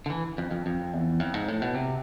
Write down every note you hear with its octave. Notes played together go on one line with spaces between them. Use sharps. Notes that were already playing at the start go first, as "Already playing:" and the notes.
D3
E3
F2
F2
F2
E2
F2
G#2
A2
B2
C3